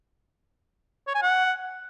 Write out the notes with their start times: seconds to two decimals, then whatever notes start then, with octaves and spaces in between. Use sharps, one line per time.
1.07 C#5
1.15 G#5
1.22 F#5